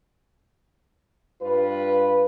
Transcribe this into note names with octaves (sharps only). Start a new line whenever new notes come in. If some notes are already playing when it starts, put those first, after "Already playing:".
G2 F4 B4